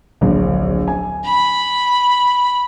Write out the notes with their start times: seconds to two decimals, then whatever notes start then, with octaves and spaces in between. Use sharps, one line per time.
0.21 D1 A#1
0.88 G#5
1.25 B5